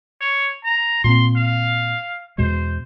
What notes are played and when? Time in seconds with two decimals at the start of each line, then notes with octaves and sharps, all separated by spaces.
0.21 C#5
0.65 A#5
1.04 A#2 A#3 C4 C6
1.37 F5
2.38 E2 B2 G#3 C5